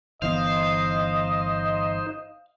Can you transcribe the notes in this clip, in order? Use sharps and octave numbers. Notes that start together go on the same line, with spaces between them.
G1 E3 B3 D#4 C5 D#5 F5